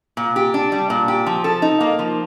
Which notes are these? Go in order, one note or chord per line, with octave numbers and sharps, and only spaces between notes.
A#2
G4
D4
G3
A#2
G4
F3
A4
D#4
A#3
F3